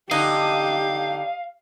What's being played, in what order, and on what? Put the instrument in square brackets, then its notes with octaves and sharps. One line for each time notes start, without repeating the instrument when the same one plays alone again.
[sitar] D3 D#4 [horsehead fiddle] G4 [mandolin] D#5 [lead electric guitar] F5